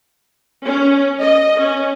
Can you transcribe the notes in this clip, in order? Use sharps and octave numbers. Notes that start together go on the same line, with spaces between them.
C#4
D#5
C#4